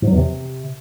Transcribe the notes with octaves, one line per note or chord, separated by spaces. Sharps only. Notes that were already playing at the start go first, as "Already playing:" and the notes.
G#2
F#3
E2
C3